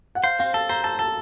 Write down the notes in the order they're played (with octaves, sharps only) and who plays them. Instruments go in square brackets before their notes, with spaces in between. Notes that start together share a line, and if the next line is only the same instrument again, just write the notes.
[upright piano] F#5
[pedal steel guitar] C5 [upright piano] F5
[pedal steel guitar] C4 [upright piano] F5
[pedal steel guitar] A4 [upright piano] A5
[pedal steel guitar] C5 [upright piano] A#5
[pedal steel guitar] A4 [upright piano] A5
[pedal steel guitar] A4 [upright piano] A5